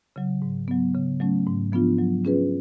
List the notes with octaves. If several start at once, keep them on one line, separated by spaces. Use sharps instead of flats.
C#3 F#3
G#2
F#3 B3
C#3
F#3 A3 C#4
G#2
F3 B3 D4 F4
F#3
C#4 F4 G#4 B4